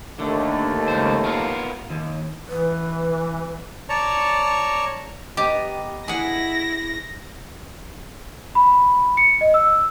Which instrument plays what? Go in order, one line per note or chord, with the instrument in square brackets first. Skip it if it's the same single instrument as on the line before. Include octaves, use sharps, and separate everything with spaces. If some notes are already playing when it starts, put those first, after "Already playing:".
[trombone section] D#2 A3 [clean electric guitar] D3
[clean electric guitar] C#2 C5
B3 F4 A#4
D#2
[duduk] E3 [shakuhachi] B4
[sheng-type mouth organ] C#5 D5 A5 A#5 C#6
[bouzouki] B3 D#5 A#5 [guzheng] G4
[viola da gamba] E4 [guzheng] G#4 F#5 [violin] A#6
[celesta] B5
C#7
D#5
E6